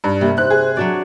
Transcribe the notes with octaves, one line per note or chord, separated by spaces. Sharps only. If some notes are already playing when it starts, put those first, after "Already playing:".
G2
C3 A#3
C5 F#6
G#4
F#3 D4 F#4 D5